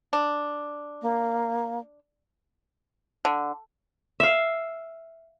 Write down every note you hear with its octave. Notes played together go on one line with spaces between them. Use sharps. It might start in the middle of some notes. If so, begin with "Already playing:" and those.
D4
A#3
D3
E5 F5